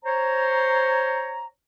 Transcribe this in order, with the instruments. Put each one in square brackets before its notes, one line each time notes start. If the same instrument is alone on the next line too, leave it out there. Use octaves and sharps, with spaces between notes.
[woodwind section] C5 C#5 A#5